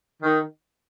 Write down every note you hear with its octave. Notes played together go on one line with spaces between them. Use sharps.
D#3